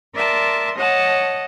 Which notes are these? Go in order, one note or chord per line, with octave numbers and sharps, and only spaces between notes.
A#4 D5 E5 A5 C6
C#5 D#5 F#5 A5